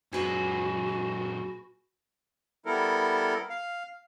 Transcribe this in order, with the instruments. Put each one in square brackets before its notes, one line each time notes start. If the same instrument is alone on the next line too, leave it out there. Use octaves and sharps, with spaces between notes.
[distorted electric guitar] F#2 A#2 [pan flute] F#4 [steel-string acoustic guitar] G#4 B4 G#5
[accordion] G3 B3 E4 A4 A#4
F5